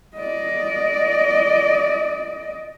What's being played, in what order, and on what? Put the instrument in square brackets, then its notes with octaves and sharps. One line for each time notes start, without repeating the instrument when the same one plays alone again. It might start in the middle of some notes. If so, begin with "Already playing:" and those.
[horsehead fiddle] D5 D#5